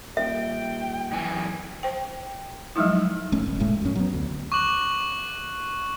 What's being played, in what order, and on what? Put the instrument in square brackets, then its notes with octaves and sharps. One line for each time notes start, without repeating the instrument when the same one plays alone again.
[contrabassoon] D#1 [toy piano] E5 [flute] G5
[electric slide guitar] F#2 E3 G#5
[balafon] C5 G5
F3 F#3 G#3 D#4 E4
[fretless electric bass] D1 A3 C#4
E1
F1 A2 G#3 A3
F#2 C#4
F#3 B3
D2
[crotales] C#6 D6 F#6 F#7